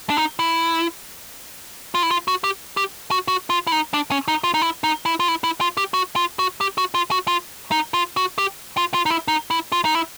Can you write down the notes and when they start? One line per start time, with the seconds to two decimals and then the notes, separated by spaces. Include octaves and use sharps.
0.10 D4
0.17 D#4
0.39 E4
1.95 F4
2.03 E4
2.11 F4
2.28 F#4
2.44 G4
2.77 G4
3.11 F#4
3.28 F#4
3.50 F4
3.67 E4
3.72 D#4
3.94 D4
4.11 C#4
4.28 D#4
4.44 F4
4.54 D#4
4.62 E4
4.84 D#4
5.05 E4
5.20 F4
5.28 E4
5.44 E4
5.61 F4
5.77 G4
5.94 F#4
6.16 F4
6.39 F#4
6.61 G4
6.78 F#4
6.94 F4
7.11 F#4
7.28 F4
7.72 D#4
7.94 F4
8.17 F#4
8.38 G4
8.77 F4
8.94 F4
9.06 D#4
9.10 E4
9.28 D#4
9.51 E4
9.72 F4
9.85 D#4
9.95 E4